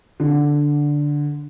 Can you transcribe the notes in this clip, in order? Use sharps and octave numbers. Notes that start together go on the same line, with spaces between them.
D3